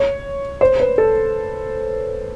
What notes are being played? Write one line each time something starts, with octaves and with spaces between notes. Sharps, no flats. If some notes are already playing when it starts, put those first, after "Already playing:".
Already playing: C#5
C5
B4
A4